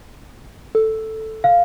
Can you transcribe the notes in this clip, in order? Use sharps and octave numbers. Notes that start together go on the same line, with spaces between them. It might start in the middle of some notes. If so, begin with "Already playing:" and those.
A4
F5